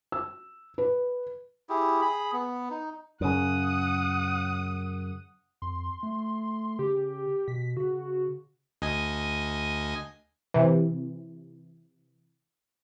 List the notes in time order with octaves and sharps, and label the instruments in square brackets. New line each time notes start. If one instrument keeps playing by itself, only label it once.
[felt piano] E6
B4
[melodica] E4 G4 G#4
G#4 B5
B3
D#4
[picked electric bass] F#2 C#3 [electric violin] F#5 D#6
[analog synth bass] F2 [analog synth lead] C6
[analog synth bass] A3
[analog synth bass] C#3 [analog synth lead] G4
[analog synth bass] B2 [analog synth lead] B6
[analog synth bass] C#3 [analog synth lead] F#4
[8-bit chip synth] D2 D#5 G#5
[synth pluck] C3 E3